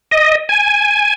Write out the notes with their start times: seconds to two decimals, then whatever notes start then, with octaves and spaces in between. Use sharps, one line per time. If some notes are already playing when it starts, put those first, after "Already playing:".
0.11 D#5
0.49 G#5